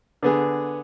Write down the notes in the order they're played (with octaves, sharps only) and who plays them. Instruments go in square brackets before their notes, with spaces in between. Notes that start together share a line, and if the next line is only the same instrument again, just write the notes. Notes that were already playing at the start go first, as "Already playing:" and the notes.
[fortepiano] D3 B3 G#4